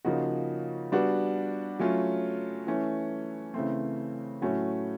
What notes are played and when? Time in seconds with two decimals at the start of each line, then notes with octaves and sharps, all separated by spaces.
0.05 C#3 F3 A#3 D#4 F#4
0.92 G3 B3 D4 F#4
1.79 F#3 A3 C#4 F4
2.67 E3 A3 C#4
3.54 C#3 E3 A3 C4
4.42 A2 F#3 A3 C#4 F#4